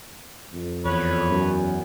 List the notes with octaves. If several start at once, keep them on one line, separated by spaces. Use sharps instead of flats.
F2
E2 B4 C#5
F#2